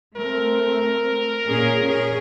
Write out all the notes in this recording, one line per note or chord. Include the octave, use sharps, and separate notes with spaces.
A3 C4 A#4
A#2 C#4 G#4
C#4 G#4